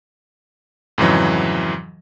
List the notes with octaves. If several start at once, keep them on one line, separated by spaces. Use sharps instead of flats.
F2 G#2 C#3 E3 F#3